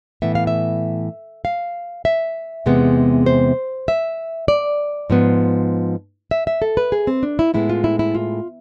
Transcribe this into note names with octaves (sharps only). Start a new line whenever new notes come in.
A2 E3 B3 E5
F5
E5
F5
E5
E2 C3 G#3 B3
C5
E5
D5
G#2 F3 B3
E5
E5
A4
B4
G#4
C4
D4
E4
A2 G#3 B3 E4
F4
E4
E4
F4